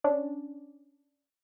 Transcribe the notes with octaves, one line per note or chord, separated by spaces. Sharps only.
C#4 D4